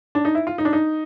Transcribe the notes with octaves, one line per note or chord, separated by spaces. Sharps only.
D4
D#4
E4
F4
D#4
D4
D#4